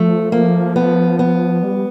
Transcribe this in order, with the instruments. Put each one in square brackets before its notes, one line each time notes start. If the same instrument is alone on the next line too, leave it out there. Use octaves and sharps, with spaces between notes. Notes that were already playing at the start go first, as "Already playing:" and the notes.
Already playing: [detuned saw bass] F3 [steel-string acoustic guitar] A3
[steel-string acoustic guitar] A#3
B3
B3
[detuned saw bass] G3